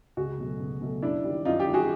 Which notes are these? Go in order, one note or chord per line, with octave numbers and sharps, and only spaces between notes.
C#2 F#4 G#4
B2 F#3 A3
C#2
B2 F#3 A3
F#2 D4 E4
D#3 G3
F#2 D#4 F4
F4 G4
D#3 G3
F#4 G#4